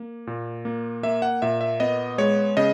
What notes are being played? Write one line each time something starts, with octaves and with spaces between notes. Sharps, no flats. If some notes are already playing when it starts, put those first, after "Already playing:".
Already playing: A#3
A#2
A#3
A#3 E5
F#5
A#2 E5
E5
B3 D#5
G#3 C#5
C#3 D#5